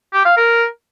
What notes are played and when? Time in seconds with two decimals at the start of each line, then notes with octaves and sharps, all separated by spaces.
0.13 G4
0.25 F5
0.37 A#4